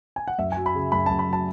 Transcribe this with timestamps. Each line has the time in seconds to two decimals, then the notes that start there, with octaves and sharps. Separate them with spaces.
0.16 G#5
0.27 F#5
0.38 F#2 E5
0.52 G#5
0.56 F#3
0.66 B5
0.75 C#3
0.92 F#2 B5
1.06 F#2 A5
1.19 B5
1.28 F#3 A5